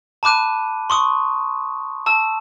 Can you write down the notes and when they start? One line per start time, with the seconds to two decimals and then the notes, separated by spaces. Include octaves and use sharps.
0.23 A5 B5 D6 F#6 D#7
0.90 C6 C#6 D#6
2.06 A5 E6